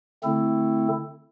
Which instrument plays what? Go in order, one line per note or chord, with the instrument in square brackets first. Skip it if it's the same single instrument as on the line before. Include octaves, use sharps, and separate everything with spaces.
[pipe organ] D3 A3 C4 E4 A4